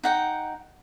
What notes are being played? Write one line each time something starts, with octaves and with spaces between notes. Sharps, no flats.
D#4 F#5 G5